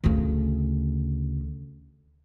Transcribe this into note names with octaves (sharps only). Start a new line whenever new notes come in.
D2 C#3